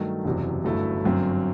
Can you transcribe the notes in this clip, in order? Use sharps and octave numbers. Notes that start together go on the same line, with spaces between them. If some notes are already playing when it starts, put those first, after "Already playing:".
Already playing: G2 D#3 F#3 A3
F#1 E2 C3 F#3
G1 F#2 F#3 A3 E4
G1 F#2 F#3 C4